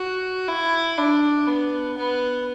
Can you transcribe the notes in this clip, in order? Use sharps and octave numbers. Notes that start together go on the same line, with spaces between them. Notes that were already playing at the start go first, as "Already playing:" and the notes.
Already playing: F#4
E4
D4
B3
B3